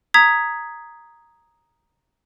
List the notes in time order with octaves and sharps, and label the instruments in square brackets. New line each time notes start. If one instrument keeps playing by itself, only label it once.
[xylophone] A#5 D#6 G#6 B6